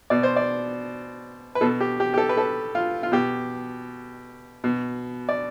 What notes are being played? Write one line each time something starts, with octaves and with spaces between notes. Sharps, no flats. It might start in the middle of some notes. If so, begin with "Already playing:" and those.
B2 D5
C5
D5
B4
B2 A4
G4
G4
G4
A4
B4
A4
F4
F4
B2 G4
B2
D5